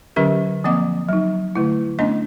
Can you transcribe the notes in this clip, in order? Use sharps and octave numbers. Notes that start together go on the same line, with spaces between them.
D3 F#3 C#4 G4 A#4
F3 A#3 C4 D#5 F#5 D6
F#3 D#4
D3 A3 E4
A3 B3 C#4 D4 D#5